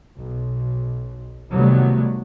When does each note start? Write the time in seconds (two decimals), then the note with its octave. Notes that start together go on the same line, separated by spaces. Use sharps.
0.19 B1
1.51 C2 D#3 F#3 G3 A3 B3